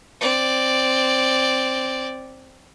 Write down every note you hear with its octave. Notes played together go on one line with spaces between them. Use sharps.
C4 D5